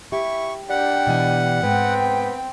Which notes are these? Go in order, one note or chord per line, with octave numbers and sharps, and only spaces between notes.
E4 G4 C#6
G3 D4 F#5 G5
B2 E3 G#5
G#2 B3 C4 G5